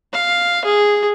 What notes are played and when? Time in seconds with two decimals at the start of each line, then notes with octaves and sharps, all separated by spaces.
0.13 F5
0.65 G#4